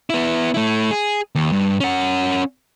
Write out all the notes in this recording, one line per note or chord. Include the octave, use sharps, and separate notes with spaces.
B3 E4
A3 E4
G#4
D#2
G2
C#4 F#5